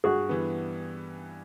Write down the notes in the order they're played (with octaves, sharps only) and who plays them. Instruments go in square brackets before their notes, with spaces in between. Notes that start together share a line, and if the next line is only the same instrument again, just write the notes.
[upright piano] G2 [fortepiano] F#4 G#4
[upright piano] E3 G3 B3